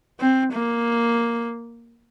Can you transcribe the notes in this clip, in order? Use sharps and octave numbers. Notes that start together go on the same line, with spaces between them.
C4
A#3